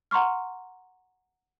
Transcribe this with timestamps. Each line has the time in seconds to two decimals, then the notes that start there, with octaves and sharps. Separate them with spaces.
0.11 F#5 A#5 C6 C#6 F6